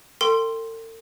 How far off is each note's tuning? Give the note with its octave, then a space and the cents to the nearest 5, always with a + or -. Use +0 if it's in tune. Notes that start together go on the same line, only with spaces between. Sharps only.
A4 +45 G5 +0 C6 +5